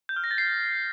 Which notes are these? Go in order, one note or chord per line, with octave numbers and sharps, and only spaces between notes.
G6
F6
A#6
A6
C7